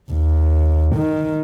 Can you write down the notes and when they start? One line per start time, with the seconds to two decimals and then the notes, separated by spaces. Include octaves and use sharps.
0.11 D#2
0.95 D#3